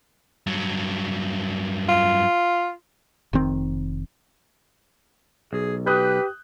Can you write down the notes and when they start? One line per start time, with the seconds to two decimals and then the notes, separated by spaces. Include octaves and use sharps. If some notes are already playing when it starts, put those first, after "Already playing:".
0.47 G2 F#3
1.89 F4
3.33 F1 D#3 C4
5.53 B1 G#4
5.86 G4 B4 D#6 F#6 G6